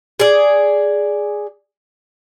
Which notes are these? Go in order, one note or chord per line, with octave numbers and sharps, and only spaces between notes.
G#4 D5